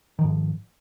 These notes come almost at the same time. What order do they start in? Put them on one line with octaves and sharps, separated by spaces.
D#3 F3 G#2